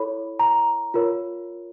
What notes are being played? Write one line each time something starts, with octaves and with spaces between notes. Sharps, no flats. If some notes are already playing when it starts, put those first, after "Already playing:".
Already playing: E4 A4 C#5 B5
A#5
F4 A#4 C#5